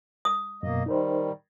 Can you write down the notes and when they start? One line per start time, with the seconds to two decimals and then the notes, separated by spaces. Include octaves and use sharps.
0.25 D#6
0.63 F#2 B2 A#3 D#5
0.86 D#3 G3 D#4 A#4 C5